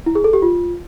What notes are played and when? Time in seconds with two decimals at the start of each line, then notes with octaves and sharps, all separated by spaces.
0.06 E4
0.15 G#4
0.24 A4
0.33 G4
0.42 F4